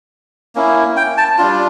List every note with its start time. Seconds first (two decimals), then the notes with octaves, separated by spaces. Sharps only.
0.55 A#3 C#4 E4
0.97 G5
1.18 A5
1.38 G3 D4 F4